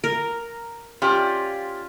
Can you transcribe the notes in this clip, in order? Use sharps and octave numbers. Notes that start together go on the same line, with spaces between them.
A#4
C#4 F4 G4 D5